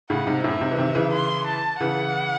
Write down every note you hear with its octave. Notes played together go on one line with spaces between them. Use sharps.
A2 C#3 F#5
G#2 C3
F#2 A2 E5
G#2 C3
E3
C3 D#3
C#3 E3
C6
A5
C#3 E3 F#5